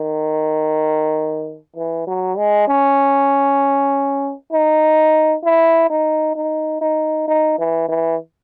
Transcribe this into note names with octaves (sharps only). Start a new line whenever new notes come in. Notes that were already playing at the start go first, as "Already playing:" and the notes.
Already playing: D#3
E3
F#3
G#3
C#4
D#4
E4
D#4
D#4
D#4
D#4
E3
E3